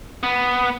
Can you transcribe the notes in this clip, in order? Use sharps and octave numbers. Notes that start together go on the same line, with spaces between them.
B3